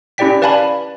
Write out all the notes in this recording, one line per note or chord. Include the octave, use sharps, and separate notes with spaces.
C#4 E4 G4 D5 G5 B6
B4 D5 F5 G#5 A5 B5